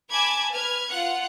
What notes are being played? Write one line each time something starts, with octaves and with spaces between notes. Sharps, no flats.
G#5 A5 B5 D6 G#6
B4 F6 G#6
F4 F#5 F#6